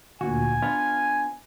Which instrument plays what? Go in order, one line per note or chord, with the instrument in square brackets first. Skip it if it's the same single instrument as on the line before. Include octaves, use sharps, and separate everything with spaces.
[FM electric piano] D2 A#2 [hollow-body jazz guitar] F#4 [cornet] G#5
[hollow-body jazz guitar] B3 D4 F4 [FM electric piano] F6